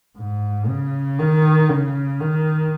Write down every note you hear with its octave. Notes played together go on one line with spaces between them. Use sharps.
G#2
C#3
D#3
C#3
D#3